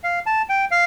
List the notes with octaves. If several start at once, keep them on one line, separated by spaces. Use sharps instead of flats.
F5
A5
G5
F5